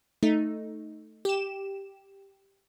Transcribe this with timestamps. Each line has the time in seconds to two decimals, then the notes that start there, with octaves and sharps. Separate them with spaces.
0.23 A3 D#4
1.25 G4 E7